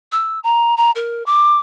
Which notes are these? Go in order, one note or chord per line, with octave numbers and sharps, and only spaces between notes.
E6
A#5
A#5
A#4
D6